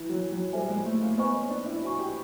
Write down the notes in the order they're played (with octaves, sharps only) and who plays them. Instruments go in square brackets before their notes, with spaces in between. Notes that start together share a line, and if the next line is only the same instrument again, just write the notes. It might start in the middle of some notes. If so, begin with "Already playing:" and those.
Already playing: [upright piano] E3
F#3
F#3
[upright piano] G3 [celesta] A4 C5 E5 G#5
[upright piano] G#3
A3
A#3
[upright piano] B3 [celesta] C5 D#5 G#5 C#6
[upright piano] C#4
D4
E4
[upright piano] F#4 [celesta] C5 D#5 G#5 C#6
[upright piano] G4